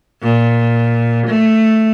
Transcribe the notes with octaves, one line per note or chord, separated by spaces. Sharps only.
A#2
A3